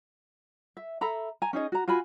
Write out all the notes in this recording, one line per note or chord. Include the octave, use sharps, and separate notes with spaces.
E5
A4 E5 A#5 B5
G#5 A#5
C#4 D#4 G#4 D#5
F#4 A#5
F4 F#4 G#5 B5